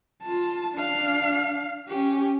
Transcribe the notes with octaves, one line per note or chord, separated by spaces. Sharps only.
F4 A5
D4 F5
C#4 G4